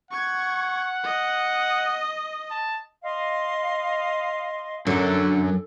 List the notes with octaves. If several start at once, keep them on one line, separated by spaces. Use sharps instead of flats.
F#5 C#6 G#6
D#5
A5
D#5 F5 C6
F#2 D3 F#3